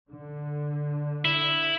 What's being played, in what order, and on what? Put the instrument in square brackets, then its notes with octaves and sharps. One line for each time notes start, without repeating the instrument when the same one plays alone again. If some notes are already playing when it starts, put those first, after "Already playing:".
[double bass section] D3
[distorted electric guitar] E4